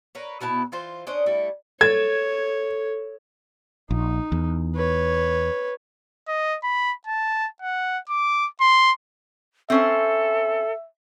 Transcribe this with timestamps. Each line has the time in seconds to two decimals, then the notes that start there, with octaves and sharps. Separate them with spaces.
0.15 A#4 B4 C#5
0.41 B2 B3 E4 A5
0.72 E3 F4 C5
1.07 C#4 D4 C5 D#5
1.26 G3 A3 E4
1.81 A4 C#5 G#6
3.91 A#1 D#4
4.32 E2
4.75 B4 C#5
6.28 D#5
6.64 B5
7.07 A5
7.62 F#5
8.09 D6
8.60 C6
9.70 C4 C#4 A4 C5 E5